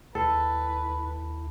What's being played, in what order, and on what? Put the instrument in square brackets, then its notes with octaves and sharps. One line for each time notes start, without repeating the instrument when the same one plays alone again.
[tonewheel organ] D#2 E4 [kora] A4 [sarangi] B4